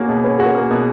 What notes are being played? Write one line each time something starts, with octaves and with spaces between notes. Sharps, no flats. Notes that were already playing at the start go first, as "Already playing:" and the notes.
Already playing: A#3 F#4 G#4 C#5
B2
C#4 B4
F#4 G#4
A#4
A#3
B2